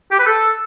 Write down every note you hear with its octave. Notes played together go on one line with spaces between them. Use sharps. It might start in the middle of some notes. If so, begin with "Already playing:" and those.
G4
B4
A4